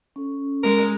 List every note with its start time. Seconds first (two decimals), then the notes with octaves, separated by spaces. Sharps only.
0.16 C#4 A4
0.64 G#3 A#4